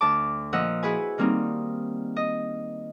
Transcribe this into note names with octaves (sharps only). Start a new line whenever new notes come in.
D2 A5 D6
A#2 F3 D#5 F#5 E6
E4 F#4 G#4 B4 G#5
D#3 G3 A#3 C4 D#4
D#5